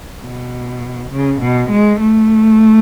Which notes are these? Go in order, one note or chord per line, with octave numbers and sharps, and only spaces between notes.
B2
C#3
B2
G#3
A3